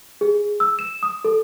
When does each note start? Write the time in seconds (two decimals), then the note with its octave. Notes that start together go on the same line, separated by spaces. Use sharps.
0.21 G#4
0.60 E6
0.79 E7
1.03 D#6
1.24 A4